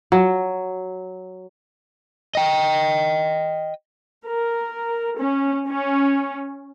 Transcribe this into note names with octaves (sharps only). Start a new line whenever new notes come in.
F#3
D#5 G5
A#4
C#4
C#4